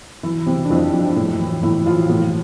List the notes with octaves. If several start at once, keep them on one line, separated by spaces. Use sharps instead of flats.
E3 E4
C3
D4
F2 E4
F2 D4
A2 E4
E3
A2 E4
E3 F3 F4
A2